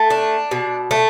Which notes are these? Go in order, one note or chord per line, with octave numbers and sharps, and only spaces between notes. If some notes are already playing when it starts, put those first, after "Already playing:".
Already playing: A3
D4
B2
A3